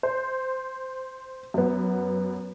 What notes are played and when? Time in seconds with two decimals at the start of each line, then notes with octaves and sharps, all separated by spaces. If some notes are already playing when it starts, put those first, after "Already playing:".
0.03 C5
1.54 F#2 B3